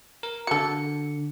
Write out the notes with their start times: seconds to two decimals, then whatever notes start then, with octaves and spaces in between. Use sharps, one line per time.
0.23 A#4
0.47 D3 F#4 A4 C#7